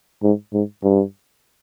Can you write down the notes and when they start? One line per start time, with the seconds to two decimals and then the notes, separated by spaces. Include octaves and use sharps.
0.23 G#2
0.53 G#2
0.84 G2